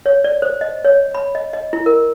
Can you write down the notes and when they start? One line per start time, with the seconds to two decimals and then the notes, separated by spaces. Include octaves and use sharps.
0.06 C#5
0.24 D5
0.42 C5
0.61 D#5
0.85 C#5
1.15 B5
1.35 D#5
1.53 D#5
1.73 E4
1.86 A#4